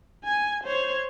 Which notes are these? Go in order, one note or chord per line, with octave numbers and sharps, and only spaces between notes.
G#5
C5 C#5